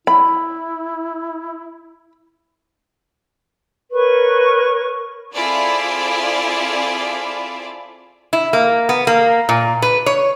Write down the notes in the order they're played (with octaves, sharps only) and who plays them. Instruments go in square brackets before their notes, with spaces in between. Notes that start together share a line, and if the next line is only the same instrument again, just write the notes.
[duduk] E4 [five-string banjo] B5
[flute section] A#4 B4 C#5 C#6
[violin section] C4 E4 F4 G#4 A4 D5
[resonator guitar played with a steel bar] E4
A#3
B3
A#3
A#2
B4
C#5